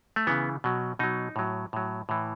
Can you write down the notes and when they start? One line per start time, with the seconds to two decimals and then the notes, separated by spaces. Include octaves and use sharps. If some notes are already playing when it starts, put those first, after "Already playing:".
0.16 A3
0.27 C#3 E3 B3
0.64 B2 F#3
0.99 B2 F#3 D#4
1.36 A2 F#3
1.73 A2 F#3
2.09 A2 E3